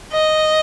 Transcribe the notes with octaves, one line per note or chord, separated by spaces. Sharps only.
D#5